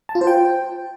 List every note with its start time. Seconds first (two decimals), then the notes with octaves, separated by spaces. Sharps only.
0.09 A5
0.15 F4
0.21 C5
0.27 G5